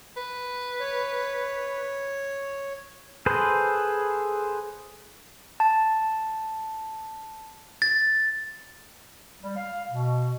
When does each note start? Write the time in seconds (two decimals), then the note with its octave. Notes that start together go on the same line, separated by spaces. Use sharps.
0.17 B4
0.80 C#5
3.26 G#4 A4 B4 C5
5.60 A5
7.82 A6
9.42 G3
9.57 F5
9.90 B2